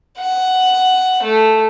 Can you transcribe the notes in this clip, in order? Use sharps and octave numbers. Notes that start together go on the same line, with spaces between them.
F#5
A3